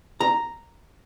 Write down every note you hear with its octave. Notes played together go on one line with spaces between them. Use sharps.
A#5